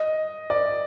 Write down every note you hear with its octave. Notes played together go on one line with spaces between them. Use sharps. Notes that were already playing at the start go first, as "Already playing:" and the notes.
Already playing: D#5
D5